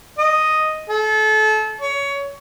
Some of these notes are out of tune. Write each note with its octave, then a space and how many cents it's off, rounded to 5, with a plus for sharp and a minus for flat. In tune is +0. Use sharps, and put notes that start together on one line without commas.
D#5 +0
A4 -30
C#5 +20